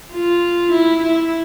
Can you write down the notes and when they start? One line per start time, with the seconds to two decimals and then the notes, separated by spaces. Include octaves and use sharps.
0.12 F4
0.71 E4
1.02 E4